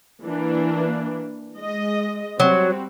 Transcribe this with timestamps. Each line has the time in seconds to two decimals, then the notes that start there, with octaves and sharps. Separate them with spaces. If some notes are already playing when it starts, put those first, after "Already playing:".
0.22 E3 A#3 D4
1.55 G#3 D#5
2.40 F#3 G3 C4 F#4